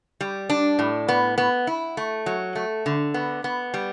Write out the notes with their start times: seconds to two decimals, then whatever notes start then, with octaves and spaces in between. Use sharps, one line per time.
0.21 G3
0.50 D4
0.79 A2
1.08 B3
1.38 B3
1.67 E4
1.97 A3
2.26 F#3
2.55 A3
2.86 D3
3.14 B3
3.44 B3
3.74 G3